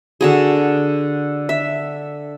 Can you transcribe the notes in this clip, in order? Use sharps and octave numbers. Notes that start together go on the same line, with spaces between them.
D3 F#4 G#4
E5